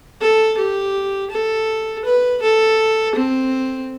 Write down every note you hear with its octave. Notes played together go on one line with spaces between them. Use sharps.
A4
G4
A4
B4
A4
C4